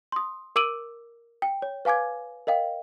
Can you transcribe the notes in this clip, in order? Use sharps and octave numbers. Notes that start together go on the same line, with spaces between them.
C6 D#6
A#4 D6 E6 D7 D#7 F#7
G5
C#5
B4 F5 G#5 D6 G#6
A#4 D#5 F5 G5